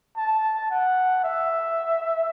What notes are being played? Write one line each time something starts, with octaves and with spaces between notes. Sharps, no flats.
A5
F#5
E5